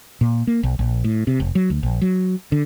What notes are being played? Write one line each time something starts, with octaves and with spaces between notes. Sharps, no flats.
A#2
A#3
B1
A#1
A2
C3
F1
F#3
D2
A#1
F#3
D3